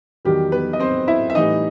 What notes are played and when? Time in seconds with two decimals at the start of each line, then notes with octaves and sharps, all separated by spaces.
0.25 E2 D#3 F#3 G3 G4
0.52 B3 B4
0.73 D#5
0.80 C4 C5
1.08 E4 E5
1.30 E5
1.35 A2 E3 G3 D#4 D#5